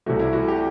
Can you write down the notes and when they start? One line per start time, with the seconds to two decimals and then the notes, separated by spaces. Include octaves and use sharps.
0.06 C2 C3 E3 A3 F#4
0.19 E4
0.33 F#4
0.48 G4